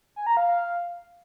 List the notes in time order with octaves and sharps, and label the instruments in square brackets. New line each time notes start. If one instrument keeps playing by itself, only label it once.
[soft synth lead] G#5
A#5
F5